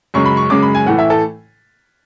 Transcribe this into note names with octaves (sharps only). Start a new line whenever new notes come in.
F#2 C#3 G#3 C#6
B5
C#6
F#2 C#3 G#3 D6
B5
G#5
A2 E3 A3 F#5
E5
A4